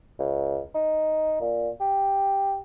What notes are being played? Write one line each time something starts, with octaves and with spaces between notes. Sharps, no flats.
C#2
D#4
A#2
G4